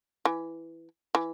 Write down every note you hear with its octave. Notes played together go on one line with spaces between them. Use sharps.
E3
E3